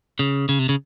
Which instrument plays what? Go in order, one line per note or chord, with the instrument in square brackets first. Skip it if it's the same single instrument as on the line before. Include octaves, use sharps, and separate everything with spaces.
[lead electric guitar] C#3
C#3
C3
C#3